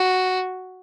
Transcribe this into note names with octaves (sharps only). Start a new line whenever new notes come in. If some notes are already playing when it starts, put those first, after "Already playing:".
Already playing: F#4